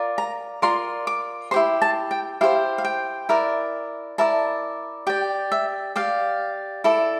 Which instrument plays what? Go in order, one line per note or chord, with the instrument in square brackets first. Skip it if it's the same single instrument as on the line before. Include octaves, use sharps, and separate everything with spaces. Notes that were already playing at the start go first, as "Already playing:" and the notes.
Already playing: [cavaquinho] F4 A#4 D5
A#5
F4 A#4 D5 C6
D6
E4 G4 C5 C6
A5
G5
E4 G4 C5 F5
F5
G5
E4 A#4 D5
E4 A#4 D5 A5
G4 D5 G5
E5
G4 D5 F5
E4 A4 D5